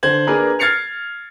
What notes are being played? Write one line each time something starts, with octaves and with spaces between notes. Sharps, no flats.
D3 C5 G#6 F#7
A#3 D4 G#4 A#4 B4
F6 G#6 A6 C7 C#7 F7